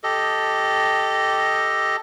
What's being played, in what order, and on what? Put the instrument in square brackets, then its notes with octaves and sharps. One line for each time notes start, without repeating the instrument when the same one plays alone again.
[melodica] G4 A4 D#5